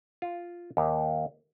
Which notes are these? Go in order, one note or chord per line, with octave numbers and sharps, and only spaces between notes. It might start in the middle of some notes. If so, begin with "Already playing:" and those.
F4
D#2